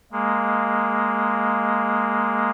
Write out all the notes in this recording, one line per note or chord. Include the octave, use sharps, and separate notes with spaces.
G#3 A#3